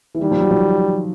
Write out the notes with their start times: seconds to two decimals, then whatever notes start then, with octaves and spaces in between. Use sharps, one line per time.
0.15 E3
0.21 D#3 G3
0.31 F3
0.41 F#3
0.51 F3